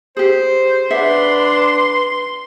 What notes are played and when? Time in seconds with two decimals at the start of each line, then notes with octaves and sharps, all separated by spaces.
0.17 G4 G#4 C5
0.91 D4 G#4 B4 E5 F#5 C6